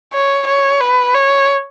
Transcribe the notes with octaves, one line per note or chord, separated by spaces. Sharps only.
C#5
C#5
B4
C#5